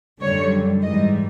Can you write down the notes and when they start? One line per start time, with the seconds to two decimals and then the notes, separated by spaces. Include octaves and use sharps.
0.21 F#2 D3 G3 C#5
0.82 G#2 E3 G3 D#5